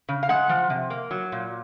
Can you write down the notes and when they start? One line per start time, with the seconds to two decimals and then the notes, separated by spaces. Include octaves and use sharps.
0.09 C#3
0.23 F5
0.29 G#3 F#5
0.49 F3
0.70 C3
0.90 A#3
1.11 F#3
1.32 A#2